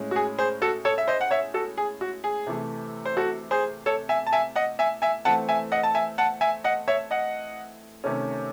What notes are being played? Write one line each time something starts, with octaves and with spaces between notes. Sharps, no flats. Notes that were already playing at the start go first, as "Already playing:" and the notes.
Already playing: A2 G#3 C#4
F#4
G#4
G#4 C5
F#4 A4
A4 C#5
E5
C5 D#5
F#5
C#5 E5
F#4 A4
G#4
F#4
G#4
C3 E3 A3
C5
F#4 A4
G#4 C5
A4 C#5
E5 G#5
A5
E5 G#5
D#5 F#5
E5 G#5
E5 G#5
E3 A3 C4 F#5 A5
E5 G#5
D#5 F#5
A5
E5 G#5
F#5 A5
E5 G#5
D#5 F#5
C#5 E5
D#5 F#5
C3 D#3 A3 C#4